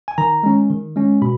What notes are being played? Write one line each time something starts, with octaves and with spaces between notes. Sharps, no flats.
G#5
D#3 A#5
G#3 C#4
D#3
G#3 C#4
B2 B5